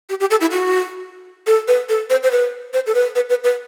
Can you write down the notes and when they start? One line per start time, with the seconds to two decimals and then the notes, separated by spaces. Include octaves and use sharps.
0.09 G4
0.20 G4
0.31 A4
0.41 E4
0.51 F#4
1.47 A4
1.68 B4
1.89 A4
2.10 C5
2.23 C5
2.31 B4
2.74 C5
2.86 A4
2.94 B4
3.15 B4
3.30 B4
3.44 B4